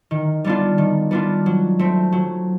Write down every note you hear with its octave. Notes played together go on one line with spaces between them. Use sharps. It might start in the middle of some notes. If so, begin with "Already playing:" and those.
D#3
G3 B3 D4 F4
D#3
G3 B3 D4 F4
F#3
A3 C4
F#3